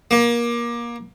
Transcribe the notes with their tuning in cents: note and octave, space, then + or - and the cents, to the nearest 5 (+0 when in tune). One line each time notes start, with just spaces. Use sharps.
A#3 +25